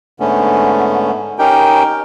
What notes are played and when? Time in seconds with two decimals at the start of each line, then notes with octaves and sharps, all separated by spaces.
0.20 G#2 D3 A3 B3 C#4
1.39 C#4 D#4 G4 A#4 G5